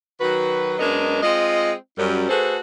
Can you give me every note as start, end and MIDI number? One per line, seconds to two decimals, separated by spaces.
0.21 0.76 51
0.21 0.76 54
0.21 0.76 66
0.21 0.76 71
0.79 1.22 42
0.79 1.22 56
0.79 1.22 59
0.79 1.22 62
0.79 1.22 70
0.79 1.22 75
1.23 1.72 56
1.23 1.72 60
1.23 1.72 65
1.23 1.72 75
1.98 2.28 42
1.98 2.28 55
2.29 2.58 57
2.29 2.58 66
2.29 2.58 68
2.29 2.58 69
2.29 2.58 71
2.29 2.58 72